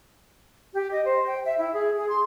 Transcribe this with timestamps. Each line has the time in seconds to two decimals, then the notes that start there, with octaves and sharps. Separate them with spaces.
0.73 G4
0.91 D#5
1.05 C5
1.27 G5
1.45 E5
1.57 E4
1.73 G#4
1.96 G#4
2.08 C6